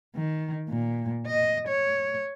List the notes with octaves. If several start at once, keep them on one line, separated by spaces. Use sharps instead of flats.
D#3
A#2
D#5
C#5